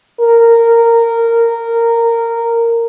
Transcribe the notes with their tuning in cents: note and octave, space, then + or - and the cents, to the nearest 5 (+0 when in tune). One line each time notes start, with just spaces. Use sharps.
A#4 -15